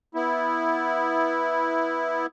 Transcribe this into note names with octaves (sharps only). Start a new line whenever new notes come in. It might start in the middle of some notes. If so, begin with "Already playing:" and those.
B3 E4